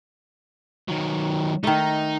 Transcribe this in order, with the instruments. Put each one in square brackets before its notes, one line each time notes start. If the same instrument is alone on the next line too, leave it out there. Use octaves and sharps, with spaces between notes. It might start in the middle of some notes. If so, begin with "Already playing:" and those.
[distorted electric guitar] D#3 F#3
[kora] D#3 A3 [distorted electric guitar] D#4